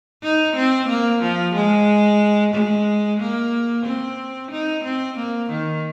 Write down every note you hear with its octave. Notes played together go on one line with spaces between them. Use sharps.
D#4
C4
A#3
F3
G#3
G#3
A#3
C4
D#4
C4
A#3
D#3